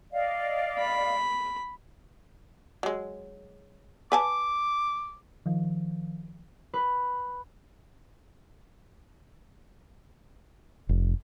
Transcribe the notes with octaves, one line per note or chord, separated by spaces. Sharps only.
D5 D#5 F5
B5
F#3 G#3
B4 G#5 A5 D6
D#3 F3
B4
F1